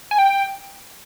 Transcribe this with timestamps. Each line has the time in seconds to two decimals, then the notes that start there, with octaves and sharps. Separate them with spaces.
0.11 G#5
0.18 G5